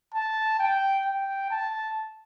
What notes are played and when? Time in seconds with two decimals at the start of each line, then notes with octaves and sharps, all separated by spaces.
0.15 A5
0.60 G5
1.06 G5
1.51 A5